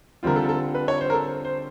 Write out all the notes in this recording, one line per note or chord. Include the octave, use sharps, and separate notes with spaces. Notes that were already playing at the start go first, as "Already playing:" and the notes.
D3 G3 C4 F4 A#4
A4
A#4
A4
B4
C#5
C5
A#4
A4
C5